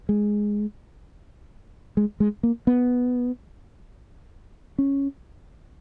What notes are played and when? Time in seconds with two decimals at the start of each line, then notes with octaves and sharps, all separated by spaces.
0.09 G#3
1.97 G#3
2.20 G#3
2.43 A#3
2.67 B3
4.78 C#4